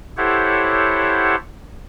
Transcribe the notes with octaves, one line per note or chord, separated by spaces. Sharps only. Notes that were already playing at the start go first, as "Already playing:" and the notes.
E4 G4 A4 C5 C#5 F#5